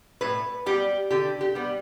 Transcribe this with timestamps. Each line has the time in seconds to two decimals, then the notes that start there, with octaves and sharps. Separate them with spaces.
0.21 A2 B4
0.66 G3 B3 G4
1.11 D3 G4
1.41 G4
1.55 G3 B3